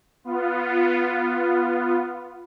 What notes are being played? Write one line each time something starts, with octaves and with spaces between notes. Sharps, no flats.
B3 F4